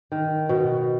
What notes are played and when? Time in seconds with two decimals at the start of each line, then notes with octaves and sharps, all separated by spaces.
0.12 D#3
0.49 B2